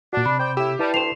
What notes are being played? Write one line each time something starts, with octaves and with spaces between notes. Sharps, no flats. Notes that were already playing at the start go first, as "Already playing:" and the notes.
A#2 D4 F#4
C3 B5
C5 D5 G5
A2 E4 G4 E6
G3 E4 B4 A5
D2 C6 E7 F7